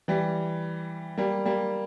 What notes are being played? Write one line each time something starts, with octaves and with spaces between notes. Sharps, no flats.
E3 G3
G3 A#3
G3 A#3